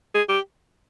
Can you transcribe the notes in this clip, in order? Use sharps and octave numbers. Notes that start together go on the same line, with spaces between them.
G#4
G4